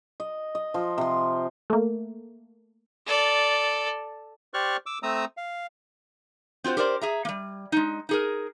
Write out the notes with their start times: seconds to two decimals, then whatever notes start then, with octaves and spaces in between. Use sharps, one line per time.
0.20 D#5
0.55 D#5
0.74 F3
0.98 C3 C6
1.70 A3 A#3
3.06 A4 D5
4.54 G4 C5 D5 C#6 F6 F#6
4.86 D6 E6
5.03 A3 C4 A#5 D#6 E6
5.37 F5
6.64 C4 F4 F#4 C5
6.77 G4 A#4 C5 D5
7.01 G#4 E5 A#5
7.25 G3 A#3
7.72 G#3 D#4
8.09 D#4 G#4 A#4